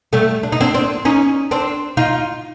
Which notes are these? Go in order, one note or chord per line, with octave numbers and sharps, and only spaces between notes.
G3 A3
D4
D#4
C4 D4
C4 D4
C#4 D#4
C4 D4
D#4 F4